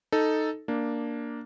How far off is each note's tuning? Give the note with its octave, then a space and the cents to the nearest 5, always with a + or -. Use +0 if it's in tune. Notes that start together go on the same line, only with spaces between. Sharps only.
D#4 +0 A4 +0
A#3 +0 D4 +0